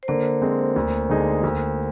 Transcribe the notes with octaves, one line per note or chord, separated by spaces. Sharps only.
C5
D3 A#3 A#4
G#3 C4
D2
D3 G#3 D#4 G#4
D2